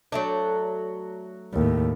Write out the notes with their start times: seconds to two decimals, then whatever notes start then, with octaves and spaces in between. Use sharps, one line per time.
0.12 F#3 A3 D4
1.53 D#2 A2